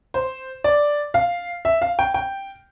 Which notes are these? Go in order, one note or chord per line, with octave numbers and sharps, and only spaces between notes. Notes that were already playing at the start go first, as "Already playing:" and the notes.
C5
D5
F5
E5
F5
G5
G5